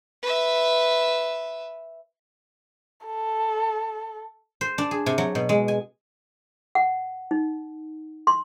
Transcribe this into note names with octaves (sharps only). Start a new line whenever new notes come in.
B4 E5
A4
C5
D4
G#4
C3
F#3
B2
G#3
G#5
F#5
D#4
C6